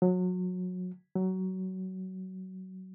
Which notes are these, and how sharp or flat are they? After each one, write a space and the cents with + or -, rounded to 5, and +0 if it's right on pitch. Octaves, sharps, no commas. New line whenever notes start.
F#3 -25
F#3 +20